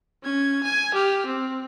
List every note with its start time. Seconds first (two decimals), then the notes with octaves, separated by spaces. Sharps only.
0.24 C#4 G#6
0.63 G#5 G#6
0.94 G4 F6
1.26 C4